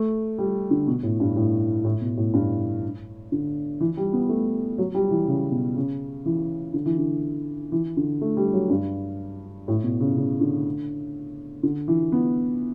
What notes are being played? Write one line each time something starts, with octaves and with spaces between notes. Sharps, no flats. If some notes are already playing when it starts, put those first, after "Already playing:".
Already playing: A3
G3
D3
B2
A2
G2
A2
A2
B2
A2
G2
D3
E3
G3
B3
A3
F#3
G3
E3
C#3
B2
C#3
E3
D3
E3
D3
E3
D3
A3
G3
F#3
G2
A2
B2
C#3
C#3
D3
D3
E3
B3